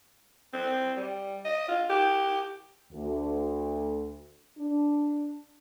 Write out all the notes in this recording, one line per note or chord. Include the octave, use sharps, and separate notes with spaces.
C4
G3
D#5
F4
G4
D2
D4